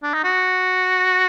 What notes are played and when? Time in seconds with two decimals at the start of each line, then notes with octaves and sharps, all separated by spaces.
0.03 D4
0.14 D#4
0.24 F#4